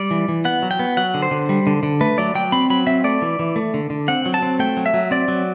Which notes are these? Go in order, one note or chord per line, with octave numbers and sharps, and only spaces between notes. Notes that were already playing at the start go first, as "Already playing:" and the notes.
Already playing: G3 D5
E3
E3
B3 F#5
F#3
G5
B3
F#3 F#5
D3
C5
D3
G3
D3
D3
A3 B4
F#3 D5
F#3 G5
C4 B5
F#3 B5
C4 E5
A3 D5
E3
E3
A3
D3
D3
C4 F#5
F#3
A5
C4
A3 G5
F#3
E5
F#3
C4 D5
F#3